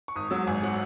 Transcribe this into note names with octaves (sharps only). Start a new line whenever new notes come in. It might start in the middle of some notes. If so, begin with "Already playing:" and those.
C#6
G#1 D#6
G#2 F#3 E6
G#1 G#5
F#3 F#5